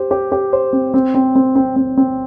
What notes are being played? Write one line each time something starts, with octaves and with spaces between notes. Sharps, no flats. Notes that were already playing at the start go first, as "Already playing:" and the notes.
Already playing: G4 C5
G4
G4
C5
C4
C4
C4
C4
C4
C4
C4